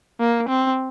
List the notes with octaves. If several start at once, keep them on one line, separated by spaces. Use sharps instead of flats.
A#3
C4